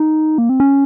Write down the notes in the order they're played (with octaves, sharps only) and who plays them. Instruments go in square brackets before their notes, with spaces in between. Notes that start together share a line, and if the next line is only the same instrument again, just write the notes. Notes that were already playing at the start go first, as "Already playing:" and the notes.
Already playing: [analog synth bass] D#4
A#3
C4
C#4